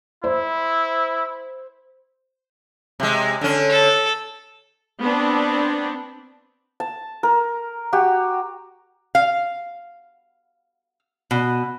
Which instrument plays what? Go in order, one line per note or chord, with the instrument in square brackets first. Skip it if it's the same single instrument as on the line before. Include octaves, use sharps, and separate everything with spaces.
[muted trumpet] E4 [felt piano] C5
[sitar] C3 G#3
D3 C#4
[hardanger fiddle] A4
[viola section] B3 C4 D4
[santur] A5
A#4
F#4 G4
[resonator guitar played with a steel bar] F5
B2